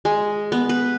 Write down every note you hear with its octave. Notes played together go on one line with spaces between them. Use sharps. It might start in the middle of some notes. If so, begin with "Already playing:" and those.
G#3
B3
B4